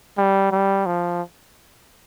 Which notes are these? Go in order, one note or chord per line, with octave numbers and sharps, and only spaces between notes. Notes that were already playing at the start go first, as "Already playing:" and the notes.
G3
G3
F3